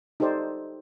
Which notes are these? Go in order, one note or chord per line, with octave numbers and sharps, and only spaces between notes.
D#4 G4 A4 C5 D5